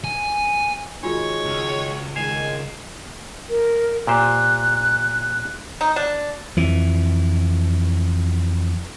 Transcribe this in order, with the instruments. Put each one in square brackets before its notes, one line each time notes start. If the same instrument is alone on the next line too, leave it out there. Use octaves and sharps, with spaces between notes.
[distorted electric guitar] G#5
[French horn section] D#3 G#3 [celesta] F4 F#4 G#5 [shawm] C#5
[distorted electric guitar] C#2
[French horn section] D#3 G#3 [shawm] G#5 [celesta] C7 E7 F7
[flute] A#4
[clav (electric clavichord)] A#2 G4 C5 [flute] F#6
[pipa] D#4
D4
[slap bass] F2 E3